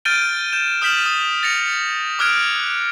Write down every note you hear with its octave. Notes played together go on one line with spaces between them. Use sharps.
F6 G6 A6 D7 D#7 G7
G6 E7
D#6 F6 G6 B6 E7 F#7
D#6
A6 A#6 C#7 F7
D6 D#6 F6 F#6 G#6 D7